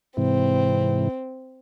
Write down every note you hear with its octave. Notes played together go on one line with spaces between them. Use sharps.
G#2 C3 E3 C4